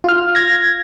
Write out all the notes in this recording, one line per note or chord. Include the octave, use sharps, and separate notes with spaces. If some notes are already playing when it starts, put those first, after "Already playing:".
F4 F6
G#6 A#6